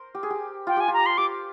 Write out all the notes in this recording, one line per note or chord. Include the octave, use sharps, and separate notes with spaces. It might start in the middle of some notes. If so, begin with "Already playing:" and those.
Already playing: A#4 C5
G4
G#4
G4
F4 G5
G4 G#5
F4
A#5
C6
G4 D6